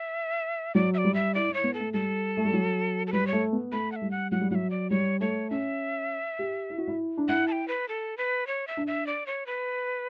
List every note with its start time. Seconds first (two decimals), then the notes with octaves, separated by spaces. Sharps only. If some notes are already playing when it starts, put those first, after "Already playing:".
Already playing: E5
0.75 F#3 D5
0.94 E5
0.98 D5
1.04 G3
1.14 E5
1.34 E4 D5
1.49 E4
1.54 C#5
1.64 B3
1.74 A4
1.79 A3
1.93 G3 A4
2.37 A3
2.45 G3
2.53 F#3
3.07 A4
3.13 G3 B4
3.27 C#5
3.32 A3
3.53 B3
3.72 A3 B5
3.92 F#5
3.96 E5
4.02 G3
4.11 F#5
4.32 F#3 F#5
4.41 G3
4.51 F#3 E5 F#5
4.70 D5
4.90 G3 C#5
5.20 A3 C#5
5.50 C#4 E5
6.39 G4
6.70 E4
6.78 F#4
6.88 E4
7.17 D4
7.28 E4 F#5
7.48 A5
7.52 G5
7.68 B4
7.88 A4
8.18 B4
8.47 C#5
8.67 E5
8.77 D4
8.87 E5
9.07 D5
9.26 C#5
9.46 B4